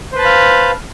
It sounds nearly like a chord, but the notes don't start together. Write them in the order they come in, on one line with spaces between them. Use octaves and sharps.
C5 B4 A5 B5 F5